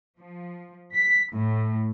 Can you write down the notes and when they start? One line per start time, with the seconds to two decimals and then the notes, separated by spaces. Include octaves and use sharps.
0.20 F3
0.94 B6
1.34 A2